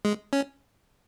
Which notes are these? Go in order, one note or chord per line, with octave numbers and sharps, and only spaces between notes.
G#3
C#4